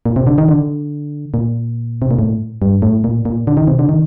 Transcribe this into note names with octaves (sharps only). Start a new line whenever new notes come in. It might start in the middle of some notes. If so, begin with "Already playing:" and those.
A#2
C3
D3
D#3
D3
A#2
C3
A#2
A2
G2
A2
A#2
A#2
D3
D#3
C3
D3
D#3